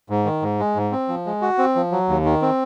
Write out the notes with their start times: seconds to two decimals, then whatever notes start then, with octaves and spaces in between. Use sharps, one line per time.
0.10 G#2
0.25 D#3
0.42 G#2
0.59 G#3
0.75 G#2
0.92 C4
1.08 F3
1.26 G#3
1.42 F#4
1.58 C4
1.76 F3
1.92 F#3
2.09 D#2
2.25 D#3
2.42 C4